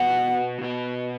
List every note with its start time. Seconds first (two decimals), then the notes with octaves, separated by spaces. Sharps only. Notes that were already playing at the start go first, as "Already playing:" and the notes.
Already playing: B2 B3 F#4 F#5
0.61 B2 B3 F#4